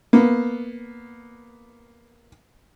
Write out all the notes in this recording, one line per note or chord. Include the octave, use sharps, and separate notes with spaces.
A#3 B3